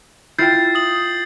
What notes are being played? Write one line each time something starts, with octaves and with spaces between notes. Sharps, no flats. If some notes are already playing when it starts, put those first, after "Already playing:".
E4 F4 G5 G6 A6 C7
D#6 F#7